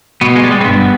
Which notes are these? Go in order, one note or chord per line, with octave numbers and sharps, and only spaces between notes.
B2 B3
G#3
G3
G#3
C4
G2 B3